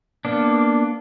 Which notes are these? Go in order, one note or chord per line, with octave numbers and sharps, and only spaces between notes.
A#3 B3 D4